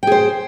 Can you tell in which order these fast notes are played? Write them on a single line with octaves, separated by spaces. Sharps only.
G5 G#4 C5